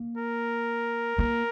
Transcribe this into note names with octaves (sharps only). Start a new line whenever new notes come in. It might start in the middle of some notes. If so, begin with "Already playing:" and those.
Already playing: A#3
A#4
A#3